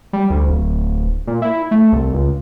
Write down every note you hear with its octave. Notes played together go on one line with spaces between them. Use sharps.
G3
D2
D1
A#2
E4
A3
C2
C#2